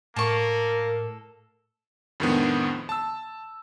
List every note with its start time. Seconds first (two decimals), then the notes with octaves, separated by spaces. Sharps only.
0.16 A2 A#3 A4 A#4 C#6
2.20 F2 A2 D#3 G#3 B3 D4
2.89 A5 E6